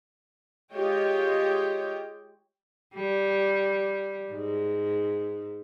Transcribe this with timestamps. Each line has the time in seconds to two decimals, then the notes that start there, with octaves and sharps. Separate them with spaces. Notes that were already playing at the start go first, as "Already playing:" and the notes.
0.72 G#3 F4 G4 C#5 D#5 G5
2.95 G3
4.33 G#2